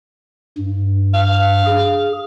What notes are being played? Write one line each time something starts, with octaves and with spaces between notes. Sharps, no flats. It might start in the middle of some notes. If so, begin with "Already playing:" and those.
G2
F5
G#4